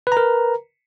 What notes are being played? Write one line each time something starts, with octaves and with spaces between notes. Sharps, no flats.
A#4 B4 A#5